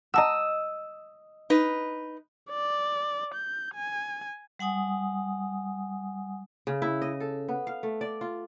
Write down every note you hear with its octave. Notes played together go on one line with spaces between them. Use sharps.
D#5 F#5 A5 A#5 E6
D#4 B4
D5
G6
G#5
G3 F#5 G#5 D#6
C#3
E4
D#5
A4
B3
F5
A3
D5
F4